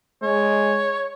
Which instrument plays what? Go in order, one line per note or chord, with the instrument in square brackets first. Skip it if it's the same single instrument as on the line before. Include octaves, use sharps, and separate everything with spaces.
[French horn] G#3 [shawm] C#5